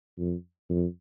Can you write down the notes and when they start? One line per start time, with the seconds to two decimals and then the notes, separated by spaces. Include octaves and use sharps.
0.18 F2
0.69 F2